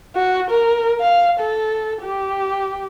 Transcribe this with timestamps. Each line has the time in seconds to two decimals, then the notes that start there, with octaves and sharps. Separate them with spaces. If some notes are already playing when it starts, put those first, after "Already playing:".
0.16 F#4
0.50 A#4
1.00 F5
1.40 A4
2.02 G4